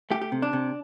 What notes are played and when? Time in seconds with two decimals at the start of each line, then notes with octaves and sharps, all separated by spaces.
0.11 A3 G4
0.22 G4
0.32 C3
0.42 D4
0.53 C3